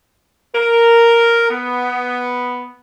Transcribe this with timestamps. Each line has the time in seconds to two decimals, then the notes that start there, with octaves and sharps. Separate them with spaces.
0.55 A#4
1.50 B3